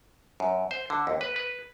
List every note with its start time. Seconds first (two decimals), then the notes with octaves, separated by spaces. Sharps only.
0.40 F#2
0.71 C5
0.90 D3
1.07 D#2
1.21 B4
1.36 B4